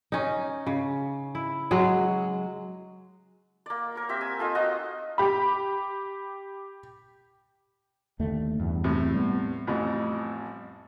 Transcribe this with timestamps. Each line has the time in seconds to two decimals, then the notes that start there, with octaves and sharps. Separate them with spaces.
0.12 C#4 D#4
0.67 C#3
1.35 E4
1.71 F#3 G#3 G#4
3.66 A#3 D5
3.96 A#4 C#5
4.09 C4 G4 E5
4.21 G#5
4.39 D#4 F4 A4
4.55 F4 F#4 D#5 G5
5.18 G4 B5
8.19 D#2 D3 A3
8.59 E2 G2
8.84 A2 C3
9.14 G3 A3 B3
9.67 A1 F2 A2